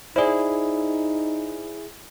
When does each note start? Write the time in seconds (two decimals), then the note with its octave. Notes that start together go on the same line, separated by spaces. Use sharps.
0.16 D#4 E4 G#4 C5 D5